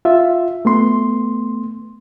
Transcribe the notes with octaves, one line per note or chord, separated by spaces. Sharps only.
F4 E5
A3 B3 C6